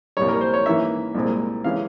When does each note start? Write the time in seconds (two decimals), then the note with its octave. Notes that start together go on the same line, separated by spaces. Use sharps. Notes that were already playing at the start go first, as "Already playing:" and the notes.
0.17 C2 A#2 G3 C#5
0.29 A#4
0.41 C5
0.54 C#5
0.66 G#2 E3 A#3 C#4 E5
1.14 C2 A#2 G#3 C4
1.64 C3 E3 G#3 C#4 F5